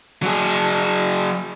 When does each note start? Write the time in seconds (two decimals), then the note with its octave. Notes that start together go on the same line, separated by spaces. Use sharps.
0.23 F#3 G#4